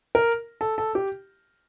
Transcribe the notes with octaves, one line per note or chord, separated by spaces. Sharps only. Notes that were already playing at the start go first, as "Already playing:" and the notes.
A#4
A4
A4
G4